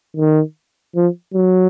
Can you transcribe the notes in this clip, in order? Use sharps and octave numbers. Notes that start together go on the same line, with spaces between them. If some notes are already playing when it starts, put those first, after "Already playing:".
D#3
F3
F#3